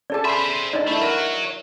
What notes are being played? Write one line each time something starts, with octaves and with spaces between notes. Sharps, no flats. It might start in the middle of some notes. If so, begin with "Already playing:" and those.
C#4 G#4 A4 D5 A5
C5 E5 G#5 B5 C6
D4 D#4 D5 D#5
A3 E4 B5
F#4 A#4 C#5